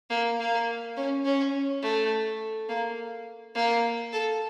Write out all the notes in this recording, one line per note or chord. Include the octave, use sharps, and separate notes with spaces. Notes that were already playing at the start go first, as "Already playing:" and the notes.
A#3
A#3
C#4
C#4
A3
A#3
A#3
A4